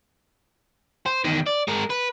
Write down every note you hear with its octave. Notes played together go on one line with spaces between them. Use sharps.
C5
E2 D#3
D5
G#3 A#4
B4